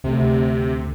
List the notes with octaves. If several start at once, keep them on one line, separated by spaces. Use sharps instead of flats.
D2 C3